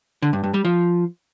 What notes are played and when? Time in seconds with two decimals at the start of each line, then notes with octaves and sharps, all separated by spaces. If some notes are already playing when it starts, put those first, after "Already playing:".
0.22 D3
0.33 G2
0.44 G2
0.54 G3
0.65 F3